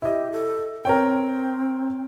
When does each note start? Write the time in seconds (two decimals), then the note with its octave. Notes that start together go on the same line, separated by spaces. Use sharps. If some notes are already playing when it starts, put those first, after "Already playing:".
0.02 E4 G4 D#5
0.32 A4
0.85 C4 A#4 C#5 G5